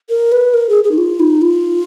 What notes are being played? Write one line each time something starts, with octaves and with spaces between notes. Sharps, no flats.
A#4
B4
A#4
G#4
G#4
D#4
F4
D#4
F4